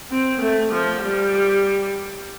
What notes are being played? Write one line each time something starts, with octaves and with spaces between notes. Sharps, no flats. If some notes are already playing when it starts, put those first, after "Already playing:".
C4
A3
F3
G3